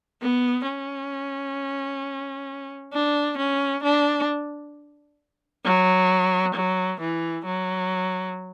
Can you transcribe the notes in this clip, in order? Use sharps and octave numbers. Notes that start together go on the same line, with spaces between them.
B3
C#4
D4
C#4
D4
F#3
F#3
E3
F#3